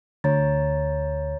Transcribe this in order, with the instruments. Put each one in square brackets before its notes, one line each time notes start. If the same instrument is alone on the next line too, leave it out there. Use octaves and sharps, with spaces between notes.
[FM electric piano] D2 [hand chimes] C#5 A#5 A6